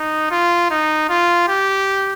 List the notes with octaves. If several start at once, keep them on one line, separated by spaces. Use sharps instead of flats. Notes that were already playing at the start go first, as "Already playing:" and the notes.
Already playing: D#4
F4
D#4
F4
G4